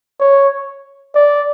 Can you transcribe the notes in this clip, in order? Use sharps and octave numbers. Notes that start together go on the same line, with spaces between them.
C#5
D5